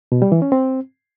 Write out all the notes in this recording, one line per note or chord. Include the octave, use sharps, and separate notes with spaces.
B2
G3
E3
C#4
C4